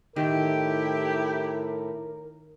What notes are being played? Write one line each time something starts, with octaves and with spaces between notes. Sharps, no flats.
A2 D#3 E4 G4 A#4